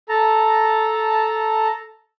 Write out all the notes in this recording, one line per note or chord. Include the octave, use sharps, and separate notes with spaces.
A4 A5 A#5